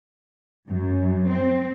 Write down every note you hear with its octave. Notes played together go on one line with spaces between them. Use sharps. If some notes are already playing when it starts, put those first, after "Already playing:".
F#2
C4